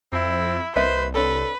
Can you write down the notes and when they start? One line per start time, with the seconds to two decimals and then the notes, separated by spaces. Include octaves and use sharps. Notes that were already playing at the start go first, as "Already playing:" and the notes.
0.12 F2 C4 E4
0.76 C2 A#3 B4 C5 D#5 E5
1.15 C4 D4 A4 B4 C#5